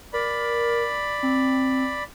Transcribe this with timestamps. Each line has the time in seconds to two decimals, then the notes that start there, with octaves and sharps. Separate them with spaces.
0.13 A#4 D5 B5
1.23 C4